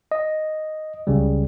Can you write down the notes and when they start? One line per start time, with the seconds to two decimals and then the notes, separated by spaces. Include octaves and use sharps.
0.12 D#5
1.07 C#2 C#3 G3